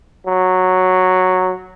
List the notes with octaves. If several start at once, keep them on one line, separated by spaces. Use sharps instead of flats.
F#3